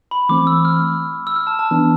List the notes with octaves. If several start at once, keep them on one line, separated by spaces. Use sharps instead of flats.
B5
E3 A3 C4 D6
E6
F6
E6
F6
A5
A5
E3 B3 D4